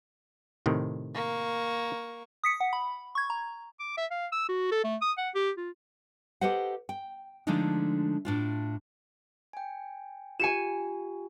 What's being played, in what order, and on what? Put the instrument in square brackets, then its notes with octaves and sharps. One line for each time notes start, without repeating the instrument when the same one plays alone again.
[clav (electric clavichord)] A2 C3 D#3
[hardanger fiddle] A#3 C#6
[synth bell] D#6 B6 C#7
F#5
B5
C#6 G#6
A#5
[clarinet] D6
E5
F5
E6
F#4
A4
A3
D#6
F#5
G4
F4
[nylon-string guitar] G4 A4 B4 C5 D#5 F#5
G5
D3 F3 G#3 A3 D4 D#4
A2 D4 F4
[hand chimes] G5 G#5
[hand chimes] F4 G4 [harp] G#5 C#7 E7